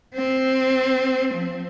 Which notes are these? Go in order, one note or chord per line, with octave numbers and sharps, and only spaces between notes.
C4
F3